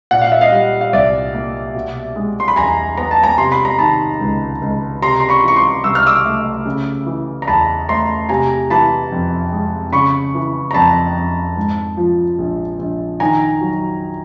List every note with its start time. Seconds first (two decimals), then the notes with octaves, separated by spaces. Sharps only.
0.11 A#2 F#5
0.21 F5
0.32 E5
0.41 D#5 F5
0.51 G3
0.81 F5
0.93 C2 D5 E5
1.34 A#3
1.75 B2
2.16 G#3
2.40 C6
2.48 B5
2.56 E2 G#5 A#5
2.97 B3 A#5
3.11 A5
3.23 G#5 A#5
3.38 C3 C6
3.52 B5
3.65 A#5
3.79 D#3 A5 B5
4.20 C#2
4.62 C#2
5.02 C3 A#5 C6
5.20 C6
5.29 B5 C#6
5.44 E3 C#6
5.56 C6 D6
5.84 C2 E6
5.95 F6
6.07 D6 E6
6.25 A3
6.66 C#3
7.06 E3
7.42 A#5
7.47 E2 A5 B5
7.89 A3 A#5 C6
8.29 C3 G#5 A#5
8.70 E3 A5 B5
9.12 F2
9.52 G#3
9.93 C#3 B5 C#6
10.35 E3
10.71 A#5
10.74 F2 A5 B5
11.16 F2
11.57 G#2
11.97 F3
12.38 A#1
12.79 A#1
13.20 D#3 G#5 A#5
13.61 F#3